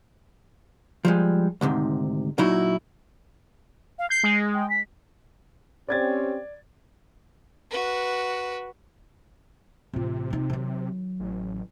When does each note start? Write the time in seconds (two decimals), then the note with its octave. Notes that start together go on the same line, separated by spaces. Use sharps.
1.05 F3 G3 G#3
1.61 D2 G#2 C3 D#3
2.38 A#2 F#3 D#4 E4 F#4
3.99 F5
4.10 G6 C7
4.23 G#3
4.54 G5
4.70 B6
5.89 C4 C#4 G4 D5 G#6 A6
7.70 F#4 B4
9.93 A1 C3 F4
10.31 F1 D#4
10.50 D#3 F#3
11.20 A1